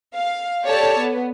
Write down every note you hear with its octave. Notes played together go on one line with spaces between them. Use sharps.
F5
G4 A4 C#5 D5 A5
B3